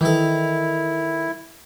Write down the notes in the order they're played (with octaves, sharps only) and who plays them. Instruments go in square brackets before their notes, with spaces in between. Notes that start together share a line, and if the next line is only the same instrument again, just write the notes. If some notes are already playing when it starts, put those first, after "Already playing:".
[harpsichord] D#3 A4 [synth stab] E3 [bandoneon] E4